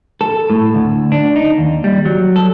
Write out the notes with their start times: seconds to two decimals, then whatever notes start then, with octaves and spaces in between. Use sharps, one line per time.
0.21 A4
0.50 A2
0.75 D2
1.12 D4
1.36 D#4
1.58 D#2
1.84 G3
2.05 F#3
2.36 A4